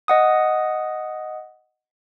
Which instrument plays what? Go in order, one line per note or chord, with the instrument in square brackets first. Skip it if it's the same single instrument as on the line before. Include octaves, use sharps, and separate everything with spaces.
[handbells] D#5 F#5 D#6